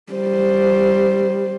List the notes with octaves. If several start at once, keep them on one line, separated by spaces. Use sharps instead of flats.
G3 C5